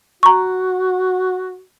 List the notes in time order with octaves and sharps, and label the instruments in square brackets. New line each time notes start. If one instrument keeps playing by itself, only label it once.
[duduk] F#4 [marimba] A#5 C#6